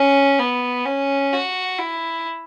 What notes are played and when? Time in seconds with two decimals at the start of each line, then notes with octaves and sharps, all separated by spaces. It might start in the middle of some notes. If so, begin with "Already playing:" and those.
Already playing: C#4
0.39 B3
0.85 C#4
1.32 F#4
1.78 E4